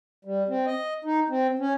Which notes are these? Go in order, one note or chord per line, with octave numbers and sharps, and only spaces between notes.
G3
C4
D#5
D#4
C4
C#4